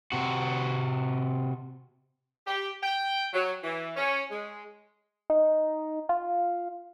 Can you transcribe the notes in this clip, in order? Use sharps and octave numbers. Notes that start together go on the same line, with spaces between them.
C3 F#4
G4
G5
F#3
E3
C#4
G#3
D#4
F4